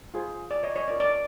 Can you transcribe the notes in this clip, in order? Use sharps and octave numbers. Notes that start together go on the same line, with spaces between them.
F4 G#4 C5
D5
C#5 D#5
C#5 D#5
C#4 F4 A#4 C#5 D5
D5